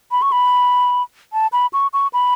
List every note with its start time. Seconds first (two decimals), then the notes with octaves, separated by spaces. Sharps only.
0.11 B5
0.22 C#6
0.32 B5
1.33 A5
1.53 B5
1.73 C#6
1.93 C#6
2.13 B5